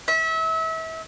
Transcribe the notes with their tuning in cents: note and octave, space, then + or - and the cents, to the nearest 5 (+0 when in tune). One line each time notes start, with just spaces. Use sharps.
E5 -30